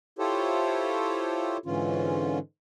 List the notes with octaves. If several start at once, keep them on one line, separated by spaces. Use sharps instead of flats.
E4 F4 G4 A4 C5 C#5
G#2 D3 E3 C#4 F4